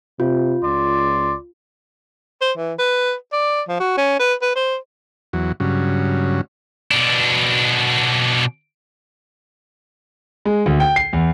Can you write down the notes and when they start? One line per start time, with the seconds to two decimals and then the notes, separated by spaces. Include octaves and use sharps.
0.20 C3 F4
0.63 C#2 D5 C6
2.41 C5
2.57 E3
2.79 B4
3.33 D5
3.68 F3
3.80 F#4
3.97 C#4
4.20 B4
4.42 B4
4.56 C5
5.33 E2 F#3
5.60 G2 C#3 F#3
6.91 B2 D4
10.45 G#3
10.66 D2
10.80 G5
10.96 C7
11.13 E2